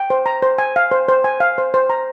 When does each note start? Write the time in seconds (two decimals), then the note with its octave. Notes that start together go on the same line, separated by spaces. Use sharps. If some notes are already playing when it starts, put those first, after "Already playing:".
Already playing: G5
0.10 C5
0.26 A#5
0.42 C5
0.58 G#5
0.76 F5
0.91 C5
1.09 C5
1.24 G#5
1.40 F5
1.58 C5
1.74 C5
1.90 A#5